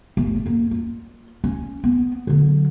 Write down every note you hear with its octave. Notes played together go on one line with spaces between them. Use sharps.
G1 A3
F#2 A#3
F4
C#4
B3
D3 F#3